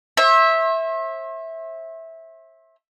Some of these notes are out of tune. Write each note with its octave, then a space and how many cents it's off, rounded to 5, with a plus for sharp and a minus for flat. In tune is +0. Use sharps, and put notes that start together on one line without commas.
C5 +45 E5 -10